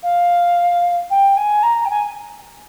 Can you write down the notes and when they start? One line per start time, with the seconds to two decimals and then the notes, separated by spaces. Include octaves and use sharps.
0.03 F5
1.10 G5
1.37 G#5
1.63 A#5
1.85 G5
1.90 G#5